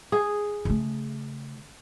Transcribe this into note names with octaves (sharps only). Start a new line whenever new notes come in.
G#4
C#3 A3